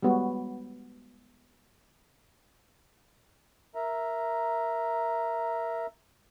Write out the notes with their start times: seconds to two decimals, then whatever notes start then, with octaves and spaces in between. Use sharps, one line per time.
0.03 G3 G#3 B3 F#4
3.75 A#4 E5 A#5